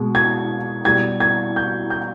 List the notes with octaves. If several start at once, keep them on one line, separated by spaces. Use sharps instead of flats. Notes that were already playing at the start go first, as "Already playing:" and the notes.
Already playing: B2 G#3
G#6
B2 G3 G#6
G#6
G6
G6